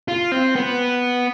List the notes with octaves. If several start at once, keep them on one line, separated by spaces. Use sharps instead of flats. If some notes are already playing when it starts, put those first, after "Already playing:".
F4
C4
B3